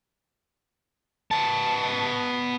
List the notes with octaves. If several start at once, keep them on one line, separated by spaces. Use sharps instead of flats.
B3 A5